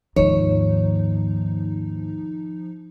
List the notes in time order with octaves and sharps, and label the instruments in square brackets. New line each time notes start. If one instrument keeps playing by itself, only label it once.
[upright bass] D#2 G#2 [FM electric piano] F3 D#4 [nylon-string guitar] C#5